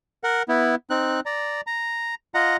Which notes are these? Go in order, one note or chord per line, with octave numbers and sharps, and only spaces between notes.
A#4 F#5
B3 E4
C4 D#4 F#6
D5 A#5
A#5
F4 D#5 F#5 A#5